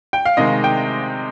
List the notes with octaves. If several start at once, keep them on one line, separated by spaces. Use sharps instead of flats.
G5
F5
C3 D#3 G#3 D#5
G5